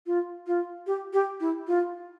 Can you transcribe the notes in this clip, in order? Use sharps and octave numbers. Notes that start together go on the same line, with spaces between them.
F4
F4
G4
G4
E4
F4